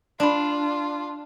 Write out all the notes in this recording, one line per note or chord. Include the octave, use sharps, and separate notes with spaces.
D4 F4 D5 B5